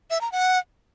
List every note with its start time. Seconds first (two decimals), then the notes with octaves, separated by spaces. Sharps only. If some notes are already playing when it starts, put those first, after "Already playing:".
0.10 E5
0.21 A#5
0.32 F#5